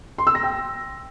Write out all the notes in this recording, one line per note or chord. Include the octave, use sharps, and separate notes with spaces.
C6
E6
A#6
G5